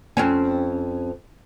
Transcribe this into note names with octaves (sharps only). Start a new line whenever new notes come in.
F2 C4 C#4